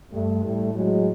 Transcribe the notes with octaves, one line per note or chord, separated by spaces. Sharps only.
G2 G3 A3
A2 G3 A3
F#3 G#3